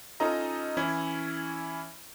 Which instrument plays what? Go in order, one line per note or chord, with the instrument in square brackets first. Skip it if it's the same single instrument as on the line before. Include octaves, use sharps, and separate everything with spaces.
[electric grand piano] C#4 D#4 F4 A4 D#5 A#5
E3 C#4 E4